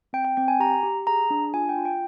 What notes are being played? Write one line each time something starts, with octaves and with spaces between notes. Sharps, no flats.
C4 G5
G5
C4 G5
G#5
G4 A#5
G4
G#4 A#5
D4
F4 G#5
G5
F4
G5